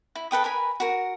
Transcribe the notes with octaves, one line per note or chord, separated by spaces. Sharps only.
E4
A4 B4 G5 D#6
A#4 B4 G#5 B5
F#4 A#4